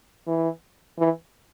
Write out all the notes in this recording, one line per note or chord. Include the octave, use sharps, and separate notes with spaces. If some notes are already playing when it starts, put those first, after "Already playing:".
E3
E3